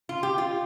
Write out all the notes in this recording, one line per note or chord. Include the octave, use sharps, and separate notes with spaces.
F4
G4
F4